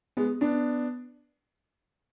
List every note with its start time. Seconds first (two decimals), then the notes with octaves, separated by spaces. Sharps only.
0.17 G#3 B3
0.41 B3 D4